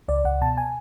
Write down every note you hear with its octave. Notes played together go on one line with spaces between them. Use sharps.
C#2 D5
C#2 F#5
B2 A5
G#5